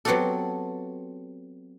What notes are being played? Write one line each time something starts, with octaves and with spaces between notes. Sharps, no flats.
F#3 B3 C4 F#4 G4 A4